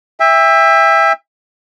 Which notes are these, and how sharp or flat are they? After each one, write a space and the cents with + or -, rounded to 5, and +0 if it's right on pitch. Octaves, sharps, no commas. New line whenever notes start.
E5 +0 G5 +40